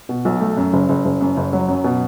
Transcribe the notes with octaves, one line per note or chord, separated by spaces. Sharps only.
B2
B1
A3
F#2
F#1
F#1
F#1
F#2
F#1
F#3
F#2
B2